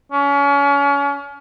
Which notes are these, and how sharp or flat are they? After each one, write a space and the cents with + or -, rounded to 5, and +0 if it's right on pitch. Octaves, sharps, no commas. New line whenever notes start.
C#4 +35